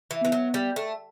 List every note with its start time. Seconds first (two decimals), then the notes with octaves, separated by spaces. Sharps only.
0.11 E3
0.22 E3 B3
0.32 F#3
0.54 G3
0.76 A3